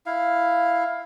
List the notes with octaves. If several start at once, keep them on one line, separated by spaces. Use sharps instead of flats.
E4 F5